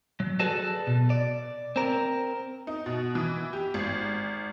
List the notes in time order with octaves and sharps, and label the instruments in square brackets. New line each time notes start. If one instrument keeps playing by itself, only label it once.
[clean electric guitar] F#3
F#4 G#4 A4 B4 D5
B2
D5
C4 A#4
[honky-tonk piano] D#4
B2
E3
G4
G#1